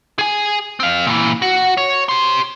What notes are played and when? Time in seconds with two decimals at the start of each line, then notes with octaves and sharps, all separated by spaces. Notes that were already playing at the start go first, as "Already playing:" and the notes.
0.19 G#4 G#5
0.80 C4 F5
1.07 A#2 E3
1.42 F#4
1.77 C#5
2.09 G4 C6